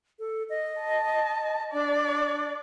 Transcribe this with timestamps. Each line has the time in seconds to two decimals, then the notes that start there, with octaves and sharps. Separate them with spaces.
0.19 A4
0.49 D#5
0.81 A5
1.73 D4 D5